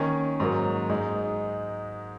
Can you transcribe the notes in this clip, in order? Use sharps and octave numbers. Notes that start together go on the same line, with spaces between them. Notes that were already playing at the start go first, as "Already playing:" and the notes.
Already playing: D#3 A#3 C#4
G#2 F#3 A#3
G#2 G#3 D#4